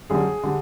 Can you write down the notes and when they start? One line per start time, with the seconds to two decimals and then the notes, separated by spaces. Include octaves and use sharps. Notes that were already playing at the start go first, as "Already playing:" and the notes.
0.10 F#2 D3 G3 G#4
0.43 D3 G3